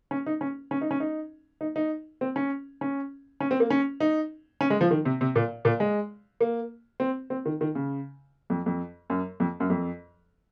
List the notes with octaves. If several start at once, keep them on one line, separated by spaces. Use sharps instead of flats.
C#4
D#4
C#4
C#4
D#4
C#4
D#4
D#4
D#4
C4
C#4
C#4
C#4
C4
A#3
C#4
D#4
C#4
G#3
F3
D#3
C3
C3
A#2
A#2
G#3
A#3
C4
C4
D#3
D#3
C#3
F2
F2
F#2
F2
F#2
F2